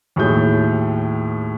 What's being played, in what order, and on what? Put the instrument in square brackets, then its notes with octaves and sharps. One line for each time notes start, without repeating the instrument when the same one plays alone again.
[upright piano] D#2 A2 F#4 G#4 C#5 G6